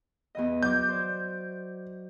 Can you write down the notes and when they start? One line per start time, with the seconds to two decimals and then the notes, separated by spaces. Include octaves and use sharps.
0.35 E2 E3 D#5
0.63 F#3 D6 G6
0.89 C5 D5